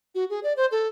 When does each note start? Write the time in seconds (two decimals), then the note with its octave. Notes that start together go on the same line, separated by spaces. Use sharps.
0.15 F#4
0.30 G#4
0.43 D5
0.57 C5
0.71 A4